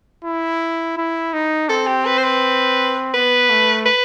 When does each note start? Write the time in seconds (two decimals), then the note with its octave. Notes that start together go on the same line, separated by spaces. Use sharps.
0.24 E4
0.97 E4
1.33 D#4
1.69 C4 A4
1.87 G4
2.06 B4
2.18 C5
2.24 B4
3.14 B3 B4
3.50 A3
3.86 B4